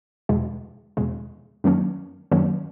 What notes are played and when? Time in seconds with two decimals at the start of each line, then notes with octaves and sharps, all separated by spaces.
0.29 E2 B2 G#3
0.97 E2 B2 G#3
1.64 F#2 D#3 F#3 A#3 C#4
2.31 F#2 D#3 F#3 A#3 C#4